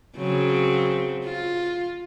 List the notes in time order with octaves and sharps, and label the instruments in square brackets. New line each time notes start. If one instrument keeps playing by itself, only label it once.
[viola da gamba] C#3 F#3 C4
F4